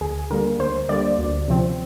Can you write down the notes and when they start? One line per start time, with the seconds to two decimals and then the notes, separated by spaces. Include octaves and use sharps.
0.01 D2 G#4
0.30 D3 G3 A#3 A#4
0.59 D2 C5
0.89 D3 G3 A#3 D5
1.19 D2
1.48 C3 F3 C4